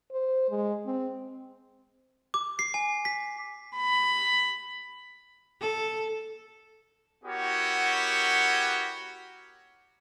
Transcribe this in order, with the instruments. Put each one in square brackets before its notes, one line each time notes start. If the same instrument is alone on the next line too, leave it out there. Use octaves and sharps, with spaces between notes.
[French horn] C5
G#3
C4
[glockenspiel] D6
C7
G#5
B6
[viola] B5
[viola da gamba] A4
[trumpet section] B3 E4 F#4 G4 A#4 C#5